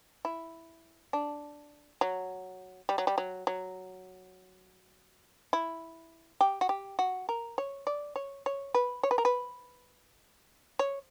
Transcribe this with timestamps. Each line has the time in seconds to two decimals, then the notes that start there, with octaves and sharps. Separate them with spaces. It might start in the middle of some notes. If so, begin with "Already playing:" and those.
0.25 E4
1.13 D4
2.01 F#3
2.89 G3
2.98 F#3
3.07 G3
3.18 F#3
3.47 F#3
5.53 E4
6.41 G4
6.61 F#4
6.69 G4
6.99 F#4
7.29 A#4
7.58 C#5
7.87 D5
8.16 C#5
8.46 C#5
8.74 B4
9.03 C#5
9.11 B4
9.18 A#4
9.25 B4
10.79 C#5